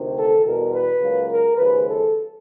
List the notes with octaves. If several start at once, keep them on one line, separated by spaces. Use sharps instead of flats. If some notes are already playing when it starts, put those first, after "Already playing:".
Already playing: D2 C3 D#3
A4
E2 B2 G3 A#4
B4
C#2 C#3 F#3 A#3
A#4
D#2 C#3 F3 G#3 B4
A4